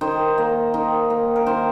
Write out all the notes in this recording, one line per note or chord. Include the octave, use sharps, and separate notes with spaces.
D#3 C5
A#3
D#3
A#3
A#4
D#3 C5